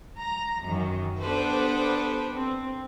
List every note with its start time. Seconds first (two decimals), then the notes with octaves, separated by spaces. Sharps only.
0.18 A#5
0.62 F#2 D#3
1.21 B3 D4 G4 A4 B4 C5
2.36 C4